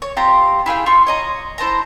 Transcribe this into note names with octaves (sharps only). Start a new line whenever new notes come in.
C#5
C4 F4 G4 A#5
E4 G#4 F5 G5
F4 C#6
C#5 D#5 A#5
E4 C5 A5 A#5